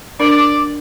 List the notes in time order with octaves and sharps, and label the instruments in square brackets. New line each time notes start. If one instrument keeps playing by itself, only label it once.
[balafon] D4 A#4 [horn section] D5